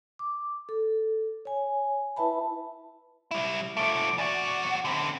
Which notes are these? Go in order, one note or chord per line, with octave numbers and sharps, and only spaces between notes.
D6
A4
C#5 G#5
E4 B4 E5 A5 B5
G3 E4
F3 A3 D6
E2 F#4 D5
D3 C4 B5